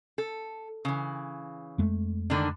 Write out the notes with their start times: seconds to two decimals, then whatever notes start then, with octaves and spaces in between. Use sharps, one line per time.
0.18 A4
0.85 C#3 E3
1.78 F2 G#3 A3
2.30 D3 D#3 D4